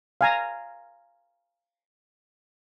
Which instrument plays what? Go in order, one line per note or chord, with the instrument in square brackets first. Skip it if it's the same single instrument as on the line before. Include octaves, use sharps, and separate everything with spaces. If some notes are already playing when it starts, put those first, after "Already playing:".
[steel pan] F5 G#5 A#5